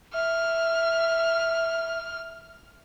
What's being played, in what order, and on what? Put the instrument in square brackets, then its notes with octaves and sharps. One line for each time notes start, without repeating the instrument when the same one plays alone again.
[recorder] E5 [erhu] F6